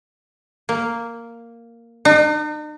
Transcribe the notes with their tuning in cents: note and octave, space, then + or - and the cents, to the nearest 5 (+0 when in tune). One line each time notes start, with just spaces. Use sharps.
A#3 -5
D#4 -45